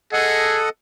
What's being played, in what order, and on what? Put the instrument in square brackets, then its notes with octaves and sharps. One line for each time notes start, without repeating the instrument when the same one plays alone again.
[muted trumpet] G#4 [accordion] A4 D#5 F#5